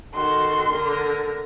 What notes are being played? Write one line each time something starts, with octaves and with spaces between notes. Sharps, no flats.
D#3 F#4 A4 C6
D3 A#4